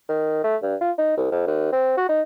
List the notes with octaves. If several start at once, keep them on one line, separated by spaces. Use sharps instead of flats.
D#3
A3
G2
F4
D#4
C2
F2
D#2
C4
F#4
D#4